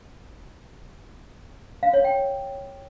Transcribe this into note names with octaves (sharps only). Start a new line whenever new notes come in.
F5
C#5
G5